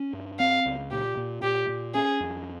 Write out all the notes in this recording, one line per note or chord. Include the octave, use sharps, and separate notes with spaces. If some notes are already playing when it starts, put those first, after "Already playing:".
Already playing: C#4
G2
C4 F5
C#2
A#2 G4
A#2
A#2 G4
A#2
C#4 G#4
F2